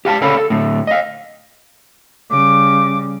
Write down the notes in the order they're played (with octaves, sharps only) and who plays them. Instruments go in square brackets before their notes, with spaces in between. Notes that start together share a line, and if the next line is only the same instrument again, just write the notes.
[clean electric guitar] G4 F5 F#5 A5
D2 C#3 A4 C#5 F5 B5
A4
A2 D3
D#5 F5
[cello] C#3 G3 [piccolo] D6